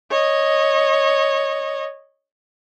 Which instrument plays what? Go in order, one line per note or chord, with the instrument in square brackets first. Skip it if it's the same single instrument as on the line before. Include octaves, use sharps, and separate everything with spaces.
[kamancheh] C#5 D#5